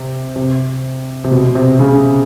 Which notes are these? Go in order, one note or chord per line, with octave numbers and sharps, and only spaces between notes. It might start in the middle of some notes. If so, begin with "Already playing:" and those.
Already playing: C3
C3
C3
B2
C3
C#3